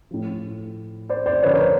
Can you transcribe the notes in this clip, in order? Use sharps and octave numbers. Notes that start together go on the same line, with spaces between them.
A2 F3
C5 D5
C5 D5
F#2 D3 F3 B4 C#5
A#4 C5